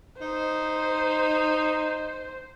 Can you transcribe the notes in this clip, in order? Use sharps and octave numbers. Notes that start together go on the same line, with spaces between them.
D#4 C5